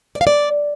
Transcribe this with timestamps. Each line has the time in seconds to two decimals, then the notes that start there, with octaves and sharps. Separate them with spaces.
0.15 D5
0.21 F5
0.27 D5